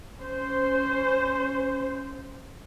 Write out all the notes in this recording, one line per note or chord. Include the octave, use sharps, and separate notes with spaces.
C#4 C5